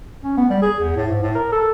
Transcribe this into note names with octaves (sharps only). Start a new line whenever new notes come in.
C#4
B3
G3
G#4
E2
A2
G#2
A2
A#4
A4